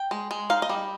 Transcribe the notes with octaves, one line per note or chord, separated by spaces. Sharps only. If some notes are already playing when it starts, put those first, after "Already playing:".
Already playing: G5
G#3
G#3
D#4 F5
D#5
G3